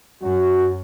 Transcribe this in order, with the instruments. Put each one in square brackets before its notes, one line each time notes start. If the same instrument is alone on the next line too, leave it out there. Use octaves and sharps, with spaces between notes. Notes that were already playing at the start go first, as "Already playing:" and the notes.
[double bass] F#2 [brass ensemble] F#4